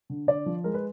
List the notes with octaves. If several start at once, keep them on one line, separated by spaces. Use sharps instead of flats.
D3
D3 D5
F3
G#3 A#4
B4